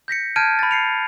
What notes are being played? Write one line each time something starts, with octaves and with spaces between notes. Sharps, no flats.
G6 A#6 B6 C#7
A5 F6 G6 G#6 D7 D#7
B5 A6
C7 C#7 F7